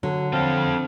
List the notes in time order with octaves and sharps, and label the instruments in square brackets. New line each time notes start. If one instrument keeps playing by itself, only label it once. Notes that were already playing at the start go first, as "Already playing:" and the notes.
[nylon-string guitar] D3 [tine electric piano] F#3
[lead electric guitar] F3 A4 [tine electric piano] C4 [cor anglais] F5